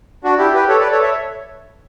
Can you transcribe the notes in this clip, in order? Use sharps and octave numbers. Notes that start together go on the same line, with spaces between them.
D4 F#4
E4 G4
G4 B4
A4 C#5
B4 D5
A4 C#5
C#5 E5